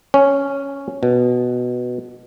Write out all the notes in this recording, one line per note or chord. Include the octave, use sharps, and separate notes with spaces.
C#4
B2